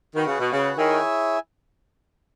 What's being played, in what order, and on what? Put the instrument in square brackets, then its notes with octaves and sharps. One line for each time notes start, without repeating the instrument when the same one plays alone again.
[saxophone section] D#3 [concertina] F#4 B4 F#5
[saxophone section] C#3
B2
C#3
[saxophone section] D#3 [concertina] E4 G#4 C#5 E5 G#5